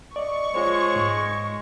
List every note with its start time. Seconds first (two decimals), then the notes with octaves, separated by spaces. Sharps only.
0.16 D5 D#5 C#6
0.54 G#3 F4 C5 C#5
0.96 G#2